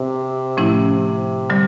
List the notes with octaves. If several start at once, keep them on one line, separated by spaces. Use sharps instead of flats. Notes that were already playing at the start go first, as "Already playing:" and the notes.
Already playing: C3
A2 F3 A3 C#4 E4
D3 G3